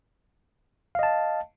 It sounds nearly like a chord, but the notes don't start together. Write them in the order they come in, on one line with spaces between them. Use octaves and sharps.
F5 D#5 A5